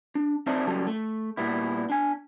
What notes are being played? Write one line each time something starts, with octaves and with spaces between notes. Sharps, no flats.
D4
C4 D#4 C5 D5 E5 A5
C#3 F#3 G3 A4
A3
A#2 G3 B3 E4
D4 G#5